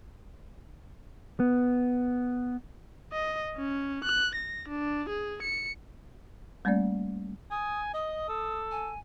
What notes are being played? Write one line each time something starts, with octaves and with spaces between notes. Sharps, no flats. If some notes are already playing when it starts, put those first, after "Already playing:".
B3
D#5
C#4
F#6
A#6
D4
G#4
C#7
G3 A3 A#3 C#4 D5
G#5 D#6
D#5 D#6
A4
G#5